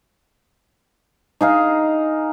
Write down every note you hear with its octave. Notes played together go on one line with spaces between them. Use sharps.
D#4 G#4 F5